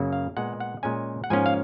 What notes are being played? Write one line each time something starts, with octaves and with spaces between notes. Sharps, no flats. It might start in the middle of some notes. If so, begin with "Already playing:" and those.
Already playing: F#2 C#3 F#3 A#3 C#4
F5
A#2 G#3 B3 F#5
F#5
A#2 G#3 C#4 G#5
F#5
G#2 F3 A#3 C#4 G#5
F5